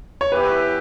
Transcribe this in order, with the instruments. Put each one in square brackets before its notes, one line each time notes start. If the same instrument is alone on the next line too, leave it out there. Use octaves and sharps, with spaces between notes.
[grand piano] C#5
[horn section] E3 B3 E4 G4 [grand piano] B4